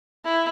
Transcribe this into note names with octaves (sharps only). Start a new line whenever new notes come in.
E4